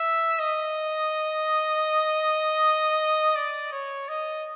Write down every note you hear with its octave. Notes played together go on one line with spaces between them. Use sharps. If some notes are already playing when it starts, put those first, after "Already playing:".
Already playing: E5
D#5
D5
C#5
D#5